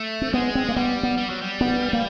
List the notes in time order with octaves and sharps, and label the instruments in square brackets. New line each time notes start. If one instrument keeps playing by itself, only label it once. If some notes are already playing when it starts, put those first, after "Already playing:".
Already playing: [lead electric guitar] A3
[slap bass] C4
[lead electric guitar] G#3 [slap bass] B3
[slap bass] C4
A#3
[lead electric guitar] G3 [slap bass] B3
[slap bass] B3
[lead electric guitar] G3
F#3
G3
[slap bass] B3
A#3